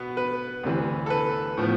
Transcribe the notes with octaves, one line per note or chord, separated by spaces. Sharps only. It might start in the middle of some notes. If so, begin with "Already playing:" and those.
Already playing: B2 B3 B4
B4
D2 C3 E3
A4
B4
A2 F3 B3